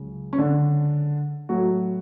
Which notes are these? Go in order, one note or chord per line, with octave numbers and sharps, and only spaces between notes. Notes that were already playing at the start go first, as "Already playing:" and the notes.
Already playing: C#2 C#3 F#3
C#4
D3 D4
A2 F#3 A3 F#4